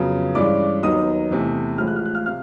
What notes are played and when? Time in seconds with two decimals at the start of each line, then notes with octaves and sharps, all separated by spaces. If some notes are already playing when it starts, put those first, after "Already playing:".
Already playing: F2 C#3 F#3 B3
0.35 G2 E3 G#3 C#4 D5 D6
0.83 D#2 D#3 F#3 B3 D#4 D#5 D#6
1.31 E2 C3 E3 A3
1.78 A1 A2 F3 G#3 F6
1.87 F#6
1.96 F6
2.06 F#6
2.15 F5 F6
2.26 C3 F5 F6